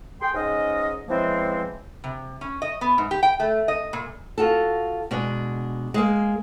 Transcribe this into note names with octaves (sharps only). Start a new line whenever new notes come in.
G#4 G5 C6
C#2 G#2 C#4 D#5
C#3 E3 F3 G#3 A#3 C4
C3
C#4
D#5
B3
G#2
G4
G5
A3
D#5
A#2
F4 F#4 A4
B2 G#3 D4
G#3 A#3